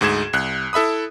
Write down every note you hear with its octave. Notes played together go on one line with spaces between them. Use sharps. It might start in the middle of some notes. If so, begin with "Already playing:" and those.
D2 G#2 G#4 G#6 E7
C2 F#6
E4 A4 E5 B5 D#6